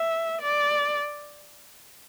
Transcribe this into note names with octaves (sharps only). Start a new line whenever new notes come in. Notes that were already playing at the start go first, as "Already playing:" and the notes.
Already playing: E5
D5